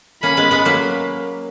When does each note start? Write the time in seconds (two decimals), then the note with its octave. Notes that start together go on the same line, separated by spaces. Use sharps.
0.23 A#3 C#4 B5
0.37 G#3 B3
0.51 G#3 B3
0.65 F#3 A#3